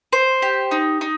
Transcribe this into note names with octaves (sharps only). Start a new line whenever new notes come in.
C5
G4
D#4
D#4